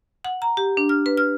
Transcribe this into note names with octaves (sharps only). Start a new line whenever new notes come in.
F#5
A#5
G4
D4
F6
B4
F6